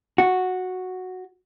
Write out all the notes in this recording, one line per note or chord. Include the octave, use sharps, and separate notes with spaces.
F#4